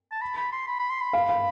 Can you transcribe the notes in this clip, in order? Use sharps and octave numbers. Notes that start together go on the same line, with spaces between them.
A5
B5
B5
C6
B5
B5
C6
B5
F5
F5